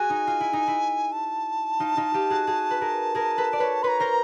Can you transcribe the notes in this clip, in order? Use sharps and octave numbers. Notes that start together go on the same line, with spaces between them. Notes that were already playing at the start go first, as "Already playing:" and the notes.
Already playing: F#4 G#4 G#5
D#4
F4
E4
D#4
E4
A5
D#4 F4
D#4 F4
F4 G4
F#4 G#4
F#4 G#4
B4
G#4 A#4
G#4 A#4
A4 B4
D5
B4 C#5
B4 C#5 A#5 C6
A#4 C5